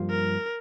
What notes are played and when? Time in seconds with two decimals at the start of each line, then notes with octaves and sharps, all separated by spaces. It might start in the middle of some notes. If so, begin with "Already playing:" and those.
Already playing: G2 F3 A#3 F4
0.10 A#4